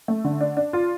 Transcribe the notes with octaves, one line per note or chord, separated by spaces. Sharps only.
A3
D3
D4
D4
F4